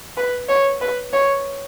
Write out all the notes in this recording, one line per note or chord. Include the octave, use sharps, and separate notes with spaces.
B4
C#5
B4
C#5